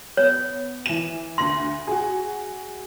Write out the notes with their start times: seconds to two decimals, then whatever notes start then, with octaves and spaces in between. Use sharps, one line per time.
0.17 B3 C#5
0.86 E3 E7
1.38 D2 C6 A#6
1.87 F#4 G#4